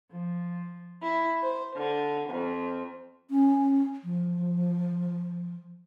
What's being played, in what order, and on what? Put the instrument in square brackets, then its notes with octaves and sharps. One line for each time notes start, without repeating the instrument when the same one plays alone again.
[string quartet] F3
E4
C5
D3
F2
[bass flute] C#4
F3